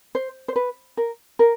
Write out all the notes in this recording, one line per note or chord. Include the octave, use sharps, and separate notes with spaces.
C5
C5
B4
A#4
A#4